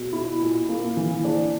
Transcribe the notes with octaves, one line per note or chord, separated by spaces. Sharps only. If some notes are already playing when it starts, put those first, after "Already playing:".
Already playing: B2
E4
A#2
A#3
E3
D4